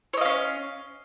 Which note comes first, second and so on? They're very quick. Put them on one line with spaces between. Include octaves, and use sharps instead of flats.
C#5 D#5 F5 C#4